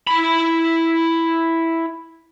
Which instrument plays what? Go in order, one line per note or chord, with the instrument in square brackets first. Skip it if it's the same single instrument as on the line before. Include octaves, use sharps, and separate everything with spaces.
[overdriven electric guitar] E4 B5